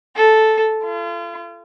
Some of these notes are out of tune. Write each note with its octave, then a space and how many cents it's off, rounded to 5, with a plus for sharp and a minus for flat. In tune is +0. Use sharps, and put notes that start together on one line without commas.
A4 -5
F4 -40